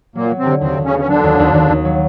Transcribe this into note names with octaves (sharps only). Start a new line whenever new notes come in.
A#2 F#3 A#3
F#3
C3 C4
D3
D#2 C3 C4
D#2
C#3 C#4
B3
C#4
D3 F#3 D4
D#2
D#2
D#2
D#2
F#3